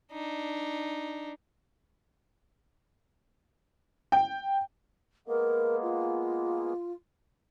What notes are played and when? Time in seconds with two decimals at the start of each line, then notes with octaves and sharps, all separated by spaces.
0.12 D4 D#4
4.12 G5
5.27 G#3 A#3 B3 A#4
5.82 F4